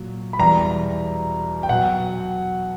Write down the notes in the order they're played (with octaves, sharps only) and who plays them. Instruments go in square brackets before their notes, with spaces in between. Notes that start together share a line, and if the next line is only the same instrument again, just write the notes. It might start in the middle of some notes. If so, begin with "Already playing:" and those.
Already playing: [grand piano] A#2 F#3
B5
E2 B2 G3 A#5
G5
B2 F#3 F#5